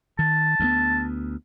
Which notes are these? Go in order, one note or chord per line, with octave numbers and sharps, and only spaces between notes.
D#3 A5
D2 G#3 B3